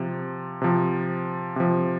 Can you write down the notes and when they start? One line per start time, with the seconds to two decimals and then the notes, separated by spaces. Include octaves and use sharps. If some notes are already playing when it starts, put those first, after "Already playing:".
Already playing: C3 F3
0.62 C3 F3
1.56 C3 F3